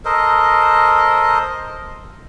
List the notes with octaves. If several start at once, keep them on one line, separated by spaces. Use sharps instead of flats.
A4 A#4 C5 D#5